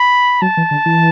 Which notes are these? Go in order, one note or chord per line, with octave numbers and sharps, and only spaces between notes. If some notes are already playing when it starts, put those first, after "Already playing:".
Already playing: B5
F#3 A5
E3
D3
E3